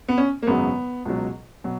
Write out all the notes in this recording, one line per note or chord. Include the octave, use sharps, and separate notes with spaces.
B3
C#4
A#3
G#1 F#2 C#3 F#3 B3
C#2 B2 F#3
B2 F#3